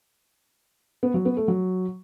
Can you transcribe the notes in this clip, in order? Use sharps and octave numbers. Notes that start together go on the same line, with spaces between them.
B3
F#3
B3
A3
F#3